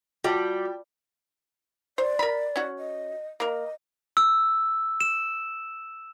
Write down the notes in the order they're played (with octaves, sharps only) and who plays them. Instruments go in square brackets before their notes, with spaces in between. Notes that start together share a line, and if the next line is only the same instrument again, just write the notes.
[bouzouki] G3 [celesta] F4 [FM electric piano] F#4 [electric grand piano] G5 A5
[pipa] C5 [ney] D5
[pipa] A#4 B5
C#4 F#4
[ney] D#5
[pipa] A#3 A#4 [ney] D#5
[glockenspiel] E6
E7